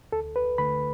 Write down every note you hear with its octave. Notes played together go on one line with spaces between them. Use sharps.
D2 A4
B4
D3 A3 B5